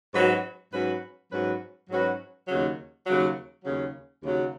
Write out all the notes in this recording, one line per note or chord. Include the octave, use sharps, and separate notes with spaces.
G#2 F#3 C#4 F#4 B4
G#2 F#3 C#4 F#4 B4
G#2 F#3 C#4 F#4 B4
G#2 F#3 C#4 F#4 B4
D#2 C#3 F#3
D#2 C#3 F#3
D#2 C#3 F#3
D#2 C#3 F#3